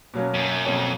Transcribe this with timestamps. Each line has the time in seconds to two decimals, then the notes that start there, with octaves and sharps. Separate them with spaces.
0.14 B2 F#3 A#3 C#4
0.34 F2
0.39 F#2
0.65 F2 B2 F#3 A#3 C#4